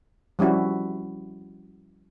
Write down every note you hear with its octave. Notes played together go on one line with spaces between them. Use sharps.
F3 G3 C#4 E4 F#4